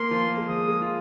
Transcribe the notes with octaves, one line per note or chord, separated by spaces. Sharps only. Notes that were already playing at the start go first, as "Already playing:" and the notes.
Already playing: A#3 A#4 C6
F3 F4
A#3
G#3
F3 D#6
G#3
F4